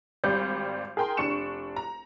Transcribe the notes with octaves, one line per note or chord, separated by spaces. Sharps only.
G#1 G3 G6
G#4 A#4 G5 A#5 C6
F1 D4 C#6 C#7 E7
A#5